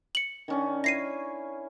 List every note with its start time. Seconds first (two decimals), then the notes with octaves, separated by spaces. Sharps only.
0.15 C#7 F#7
0.48 D#3 C#4 D4
0.84 E4 C#5 A#6 C7 D#7